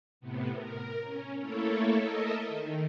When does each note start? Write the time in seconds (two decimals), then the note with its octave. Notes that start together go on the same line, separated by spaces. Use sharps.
0.20 A2 C3 B3
0.54 A#4
1.03 C#4
1.39 A3 A#3 E4 A4 C#5
1.94 A4 A#4 D#5 E5
2.47 D#3